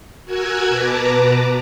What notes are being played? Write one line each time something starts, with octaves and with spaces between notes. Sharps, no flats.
F#4 A#4 G#5 E6 F#6 G#6
B2 B4 A5 A#5 D6